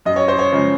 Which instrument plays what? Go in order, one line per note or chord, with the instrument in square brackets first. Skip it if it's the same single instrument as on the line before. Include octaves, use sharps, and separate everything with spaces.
[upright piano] F#2 D#5
C#5
C5
C#5
C#3 F3 G#3